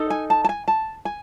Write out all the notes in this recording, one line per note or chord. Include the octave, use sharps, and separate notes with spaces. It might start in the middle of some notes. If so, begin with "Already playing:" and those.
Already playing: D#4 A4
G#5
A5
A5
G#5
A5
G#5